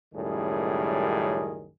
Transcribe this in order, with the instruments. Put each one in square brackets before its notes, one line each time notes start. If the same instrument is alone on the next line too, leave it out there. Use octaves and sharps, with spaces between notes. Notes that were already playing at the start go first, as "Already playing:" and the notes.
[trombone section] C#2 F#2 A2 D#3 G3 G#4